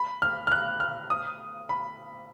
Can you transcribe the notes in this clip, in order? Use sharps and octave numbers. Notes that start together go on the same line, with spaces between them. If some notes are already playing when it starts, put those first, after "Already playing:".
Already playing: B5
F6
F6
F#6
F6
D#6
B5